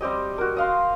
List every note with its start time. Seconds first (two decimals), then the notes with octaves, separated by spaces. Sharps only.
0.01 G3 C4 G4 D#5
0.38 F#4 A#4
0.57 D#5 F5 C6